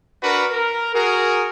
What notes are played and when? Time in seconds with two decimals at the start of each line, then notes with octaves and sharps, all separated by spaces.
0.22 D4 F#4 A#4 B4
0.53 A#4
0.94 F#4 G#4 A#4